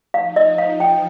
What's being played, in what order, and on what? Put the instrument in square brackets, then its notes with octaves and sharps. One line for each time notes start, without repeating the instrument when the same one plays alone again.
[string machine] F3 D#4 [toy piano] F5
[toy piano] D#5
F5
G5